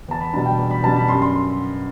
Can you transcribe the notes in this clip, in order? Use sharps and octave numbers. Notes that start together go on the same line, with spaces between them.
E2 A5
B5
B2 G3 D4 A5
G5
E2
B5
B2 G3 D4 A5
B5
F#2 C6
C6